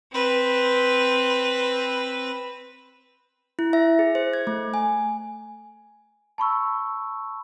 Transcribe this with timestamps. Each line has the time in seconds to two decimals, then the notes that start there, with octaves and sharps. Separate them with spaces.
0.13 C4 B4
3.59 E4
3.73 E5
3.99 G#4
4.15 C5
4.33 G#6
4.47 A3
4.74 G#5
6.38 A5 B5 C#6 E6